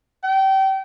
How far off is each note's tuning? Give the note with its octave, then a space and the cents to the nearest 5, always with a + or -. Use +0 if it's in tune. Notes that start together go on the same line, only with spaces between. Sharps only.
G5 -30